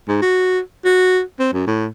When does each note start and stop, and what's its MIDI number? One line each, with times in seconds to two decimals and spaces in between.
0.08 0.18 44
0.22 0.60 66
0.85 1.21 66
1.39 1.50 60
1.53 1.63 42
1.67 1.88 45